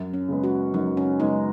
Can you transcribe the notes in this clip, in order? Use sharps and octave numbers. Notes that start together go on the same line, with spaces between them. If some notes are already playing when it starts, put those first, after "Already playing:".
Already playing: F#2
C#4
C#3 G#3 B3
F#4
F#2 D#4
C#4
C#3 G#3 B3 D#4